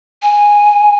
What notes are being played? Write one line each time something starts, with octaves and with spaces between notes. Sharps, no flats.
G#5